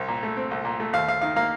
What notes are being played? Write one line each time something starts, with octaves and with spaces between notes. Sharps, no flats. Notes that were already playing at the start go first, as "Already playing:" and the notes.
Already playing: C2 C4
A#2
A3
C4
C2
A#2
A3
D#2 F5
D#2 F5
D#3 F5
A#3 F5